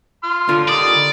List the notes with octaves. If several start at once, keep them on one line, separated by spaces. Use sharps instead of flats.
C6 F6
D3 F4
D#3 G3 D5 D#6